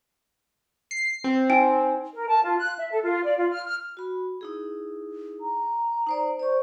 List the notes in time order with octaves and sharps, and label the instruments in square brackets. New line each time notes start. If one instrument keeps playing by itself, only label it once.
[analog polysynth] C7
C4
[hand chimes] D#4 G#5 [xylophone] G5
[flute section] A#4
A5
F4
F#6
E5
A4
F4
D5
F4
F6
F6
[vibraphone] F#4 B5
D#4 E4 G#4
[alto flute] A#5
[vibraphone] D#4 C5 D5
[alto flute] C5 [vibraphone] D5 C#6